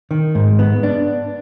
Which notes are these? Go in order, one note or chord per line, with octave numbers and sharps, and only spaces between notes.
D#3
G#2
B3
D4